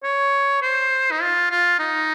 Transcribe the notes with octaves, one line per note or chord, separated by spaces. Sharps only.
C#5
C5
D#4
F4
F4
D#4